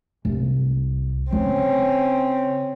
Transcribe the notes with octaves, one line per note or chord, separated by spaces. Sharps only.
C2
C#3 C4 C#4